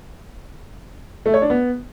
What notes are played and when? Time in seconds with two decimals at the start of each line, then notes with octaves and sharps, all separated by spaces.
1.26 A3
1.34 C#5
1.42 D4
1.50 B3